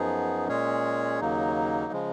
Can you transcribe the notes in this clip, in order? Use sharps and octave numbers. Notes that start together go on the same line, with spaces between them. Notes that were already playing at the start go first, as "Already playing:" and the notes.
Already playing: F#2 F3 B3 D#4 G#4
A#2 G#3 C#4 G#4 C#5
D#2 C#3 F#3 A#3 D#4
C#3 F3 G#3